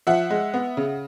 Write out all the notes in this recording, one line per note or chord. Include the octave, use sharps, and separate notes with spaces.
F3 E5 F#5
G#3
B3
C#3